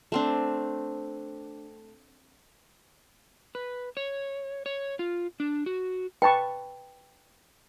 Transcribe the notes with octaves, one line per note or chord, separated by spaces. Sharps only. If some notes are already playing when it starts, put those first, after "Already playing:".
A3 C4 D4
B4
C#5
C#5
F4
D4
F#4
B4 G5 A5 C#6